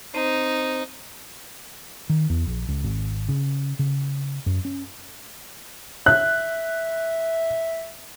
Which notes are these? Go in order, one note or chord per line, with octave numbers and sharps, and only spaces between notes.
C4 D#4 C5
D#3
E2
A#1
C#2
G#1
C#3
C#3
F#2
C#4
E5 F#6